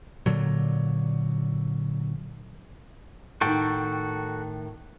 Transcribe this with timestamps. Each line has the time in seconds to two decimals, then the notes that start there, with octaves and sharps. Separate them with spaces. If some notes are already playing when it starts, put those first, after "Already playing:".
0.26 A#2 D3 F#3
3.41 A2 D#3 F#4 A4 G5